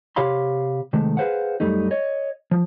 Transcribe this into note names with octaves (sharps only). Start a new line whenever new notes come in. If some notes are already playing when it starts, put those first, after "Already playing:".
C3 G4 C#5 F5 B5 C6
C3 D#3 G#3 A3
G#4 B4 C5 F5 F#5
F#2 G3 A3 D#4
C#5 D#5
F3